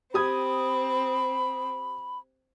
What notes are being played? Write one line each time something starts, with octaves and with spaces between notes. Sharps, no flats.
C4 G4 B5 D#6 G#6